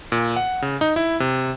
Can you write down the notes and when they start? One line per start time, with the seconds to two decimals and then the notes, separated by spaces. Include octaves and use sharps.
0.12 A#2
0.36 F#5
0.62 C#3
0.81 D#4
0.96 E4
1.20 C3